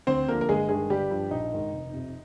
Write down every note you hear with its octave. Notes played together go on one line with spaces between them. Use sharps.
D2 C4 C5
D3 F3 A#3 A#4
A#4
G1 G#3 G#4
G2 D#3 G#3 G#4
G1 G3 G4
G2 F3
A#1 D#4
G#2 D#3
F1
F2 C3